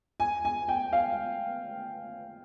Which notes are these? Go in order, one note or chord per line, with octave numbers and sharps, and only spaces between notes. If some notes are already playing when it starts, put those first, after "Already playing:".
G#5
G#5
G5
F5